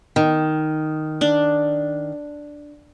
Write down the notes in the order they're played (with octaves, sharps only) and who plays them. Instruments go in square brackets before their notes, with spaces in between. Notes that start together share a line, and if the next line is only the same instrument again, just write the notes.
[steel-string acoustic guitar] D#3
[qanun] D4